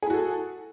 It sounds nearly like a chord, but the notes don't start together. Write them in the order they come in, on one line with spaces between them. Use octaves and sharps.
G#4 E4 F#4 A4